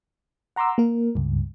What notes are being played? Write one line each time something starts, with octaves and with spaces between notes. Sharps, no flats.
F#5 A#5 C6 D6 E6
A#3 A#4
C#2 G2